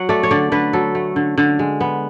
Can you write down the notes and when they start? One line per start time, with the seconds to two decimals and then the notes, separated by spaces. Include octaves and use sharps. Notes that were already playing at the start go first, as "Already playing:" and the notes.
Already playing: F#3 F#5
0.09 A3 D5
0.23 C#5
0.31 D3 D5
0.52 D3 B4
0.73 F#3 A4
0.95 A3
1.16 D3
1.38 D3
1.59 G#3
1.81 B3